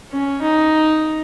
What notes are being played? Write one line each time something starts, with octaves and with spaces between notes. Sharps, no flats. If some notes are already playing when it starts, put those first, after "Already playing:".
C#4
D#4